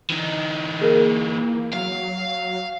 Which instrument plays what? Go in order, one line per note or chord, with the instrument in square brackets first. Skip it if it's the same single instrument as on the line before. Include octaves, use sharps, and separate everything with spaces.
[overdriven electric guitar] E3 D#4
[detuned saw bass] A#3 [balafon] G#4 A#4
[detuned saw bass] F#3 [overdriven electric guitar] F5